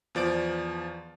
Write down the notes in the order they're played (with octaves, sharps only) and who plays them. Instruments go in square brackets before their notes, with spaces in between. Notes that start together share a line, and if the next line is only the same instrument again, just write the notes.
[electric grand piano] E2 F3 D5 D7